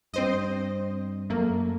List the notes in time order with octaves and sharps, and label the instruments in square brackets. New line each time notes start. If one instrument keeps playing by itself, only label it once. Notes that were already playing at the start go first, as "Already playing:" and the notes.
[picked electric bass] G2 [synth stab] C4 C5 D#5
[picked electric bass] F#2 [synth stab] A3 A#3